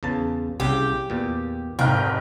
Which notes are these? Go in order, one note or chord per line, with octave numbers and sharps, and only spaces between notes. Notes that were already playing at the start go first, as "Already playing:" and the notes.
E2 C#3 A5
C2 C#3 G4
E2 A#2
F1 G#2 A#4 F5 G5 F6